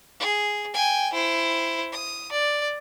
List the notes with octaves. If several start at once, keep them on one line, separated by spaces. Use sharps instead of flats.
G#4
G5 G#5
E4 C5
D#6
D5